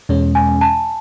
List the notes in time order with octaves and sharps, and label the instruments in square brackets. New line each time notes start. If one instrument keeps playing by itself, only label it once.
[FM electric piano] E2 B2 G#3 C#4
[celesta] G#5
A5